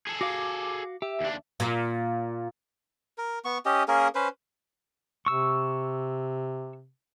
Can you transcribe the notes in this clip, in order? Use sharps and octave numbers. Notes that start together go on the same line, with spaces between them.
G#4 A4
F#4 F5 D6
G4 E5
D#2 D4
A#2
A#4
B3 C#6
C#4 G4 D#5
A#3 C#4 G#4 A#4
C#4 B4 C5
C3 C#6 E6